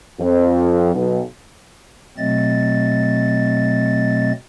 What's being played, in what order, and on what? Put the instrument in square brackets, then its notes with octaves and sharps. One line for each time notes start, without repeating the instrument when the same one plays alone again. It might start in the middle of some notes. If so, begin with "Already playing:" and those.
[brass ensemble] F2
B1
[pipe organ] B2 F#3 A3 C4 D#5 A6